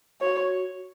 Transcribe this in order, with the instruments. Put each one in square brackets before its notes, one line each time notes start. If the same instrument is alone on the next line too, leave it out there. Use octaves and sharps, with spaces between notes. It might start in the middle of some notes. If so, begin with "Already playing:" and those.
[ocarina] F#4 [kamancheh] C#5